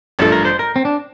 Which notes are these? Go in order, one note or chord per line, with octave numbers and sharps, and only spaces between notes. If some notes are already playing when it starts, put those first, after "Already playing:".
A1 G2 F3 A3 A4
A#4
C5
A#4
C4
D4